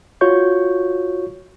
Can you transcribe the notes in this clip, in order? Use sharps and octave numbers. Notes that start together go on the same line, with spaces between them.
F4 F#4 C#5 C#6 G6